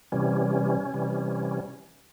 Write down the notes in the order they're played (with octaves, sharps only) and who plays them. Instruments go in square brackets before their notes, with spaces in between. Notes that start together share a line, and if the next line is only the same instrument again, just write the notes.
[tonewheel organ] C3 E3 G3 C#4
C3 E3 G3